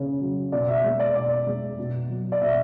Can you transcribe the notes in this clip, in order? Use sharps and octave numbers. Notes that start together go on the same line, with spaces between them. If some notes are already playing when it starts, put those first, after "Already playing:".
Already playing: C#3
F#3
B2 D5
E5
G#3
D5
B2 D5
G#3
B2
F#3
D5
B2 E5